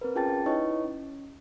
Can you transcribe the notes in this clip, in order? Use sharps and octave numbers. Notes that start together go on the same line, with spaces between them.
C4 A#4 B4
C#4 F4 G#4 G5 A5 A6
D#4 E4 B4 C#5 D#5 C#6
C#4